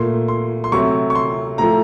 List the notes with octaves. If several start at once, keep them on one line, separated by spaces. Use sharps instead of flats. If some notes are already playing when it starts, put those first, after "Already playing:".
Already playing: A#2 A3 C6
C6
C6
C3 F#3 A3 C#6
C#6
C6
A2 F3 A3 A#5